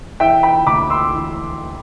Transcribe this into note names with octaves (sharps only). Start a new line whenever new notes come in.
E3 E5 G5
G5 B5
D2 B5 D6
C6 E6
E3